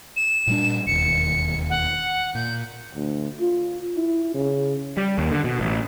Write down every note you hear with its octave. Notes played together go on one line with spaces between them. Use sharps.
E7
A#2 G3 D4
E1 D#2 C#7
F#5
A#2 G6
D2
F4
E4
C#3
G3
D#2
D3
B2
A1